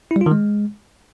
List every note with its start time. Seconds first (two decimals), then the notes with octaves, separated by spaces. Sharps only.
0.11 E4
0.16 G3
0.21 F4
0.26 D#3
0.31 G#3